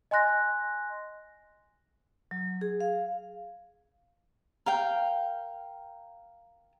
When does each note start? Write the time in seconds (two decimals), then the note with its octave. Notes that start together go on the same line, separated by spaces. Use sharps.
0.11 D#5 G#5 C6 F#6 A#6
2.31 F#3
2.61 G#4
2.80 F5
4.66 A#4 F5 G5